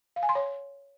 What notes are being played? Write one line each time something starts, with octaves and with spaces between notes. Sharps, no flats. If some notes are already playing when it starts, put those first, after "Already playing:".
F5
G#5
C6
C#5